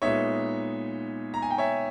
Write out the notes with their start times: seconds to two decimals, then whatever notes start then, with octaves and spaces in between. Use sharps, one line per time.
0.02 A#2 G#3 B3 D#4 C#5 E5
1.34 A#5
1.42 G#5
1.50 G5
1.58 C#5 E5